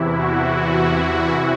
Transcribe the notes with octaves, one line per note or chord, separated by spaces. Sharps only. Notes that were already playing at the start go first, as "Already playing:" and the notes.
Already playing: E2 C3 E3 E4
F#4